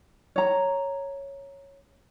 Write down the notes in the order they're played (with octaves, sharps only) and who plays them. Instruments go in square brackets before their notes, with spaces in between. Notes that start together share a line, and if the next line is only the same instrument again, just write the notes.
[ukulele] C#5 A#5